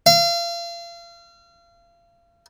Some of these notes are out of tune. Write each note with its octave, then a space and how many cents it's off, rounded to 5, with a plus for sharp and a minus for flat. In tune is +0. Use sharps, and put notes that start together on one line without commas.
F5 -35